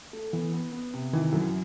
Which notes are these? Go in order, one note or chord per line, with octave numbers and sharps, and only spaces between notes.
A3
E3 B3
B3
B3
C3
D#3 E3
F#2